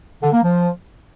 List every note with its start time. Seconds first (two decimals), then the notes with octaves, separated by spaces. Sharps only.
0.23 D3
0.33 A#3
0.43 F3